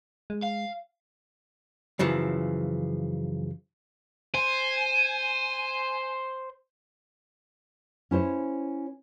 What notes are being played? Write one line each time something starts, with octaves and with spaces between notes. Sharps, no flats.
G#3
F5
F#2 C#3 E3 F3
C5 G#5
C#4 E4 C5 C#5